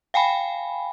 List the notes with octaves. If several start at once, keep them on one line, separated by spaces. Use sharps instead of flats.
F5 G5 G#5 B5